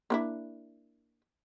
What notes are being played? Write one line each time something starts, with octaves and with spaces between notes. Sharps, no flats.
A#3 D4 E4